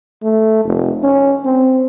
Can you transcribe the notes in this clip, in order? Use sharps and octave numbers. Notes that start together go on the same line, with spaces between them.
A3
F1
C#4
C4